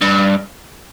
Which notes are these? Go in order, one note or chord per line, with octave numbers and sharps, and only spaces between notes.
G2